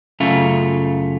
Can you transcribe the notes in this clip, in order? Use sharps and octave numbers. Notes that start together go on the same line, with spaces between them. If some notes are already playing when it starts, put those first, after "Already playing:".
F#2 C#3 A3 F4